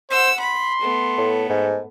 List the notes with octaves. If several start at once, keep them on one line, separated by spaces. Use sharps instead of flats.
C5 F#5 E6
B5 C6
A3 B3
A2
G#2